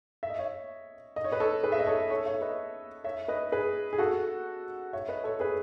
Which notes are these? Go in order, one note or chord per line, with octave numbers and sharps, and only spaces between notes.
E5
D#5
C#5 E5
D#5
C#5
B4 D#5
A4 C#5
G#4 B4
E5
D#5
A4 C#5
A4 C#5
C#5 E5
B4 D#5
C#5 E5
B4 D#5
G#4 B4
G#4
F#4 A4
C#5 E5
B4 D#5
A4 C#5
G#4 B4